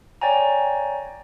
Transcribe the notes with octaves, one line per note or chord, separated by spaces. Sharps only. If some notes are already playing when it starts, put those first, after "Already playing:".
C#5 D5 G5 G#5 A#5